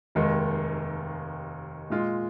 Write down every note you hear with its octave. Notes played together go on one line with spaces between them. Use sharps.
F1 D#2 D#3 G#3
A#2 G#3 F4